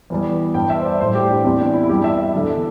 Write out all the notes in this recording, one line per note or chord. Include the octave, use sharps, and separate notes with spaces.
E2 E3 G3
G2 G3 G5
E5
C5
D5
A2 G3 C5
G4
D4
E2 E3 G3 C4
D4
E4
E4
G2 G3 G4
E5
E5
E2 D3 G3